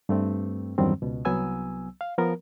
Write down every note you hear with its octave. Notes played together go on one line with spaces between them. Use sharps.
G2 A3 C4
E2 G2 D#3 F#3 G3 C4
C#2 B2
C2 F#3 B3 G#5 E6
F5
F3 B3 A#4